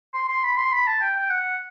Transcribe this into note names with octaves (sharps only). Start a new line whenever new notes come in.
C6
C6
B5
C6
B5
A5
G5
G5
F#5